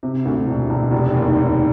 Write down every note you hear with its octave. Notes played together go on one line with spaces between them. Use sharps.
C3
D2
E1
E1
F1
D#2
D#2